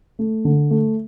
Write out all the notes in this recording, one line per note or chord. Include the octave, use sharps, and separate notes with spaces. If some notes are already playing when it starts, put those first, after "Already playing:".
A3
D3
A3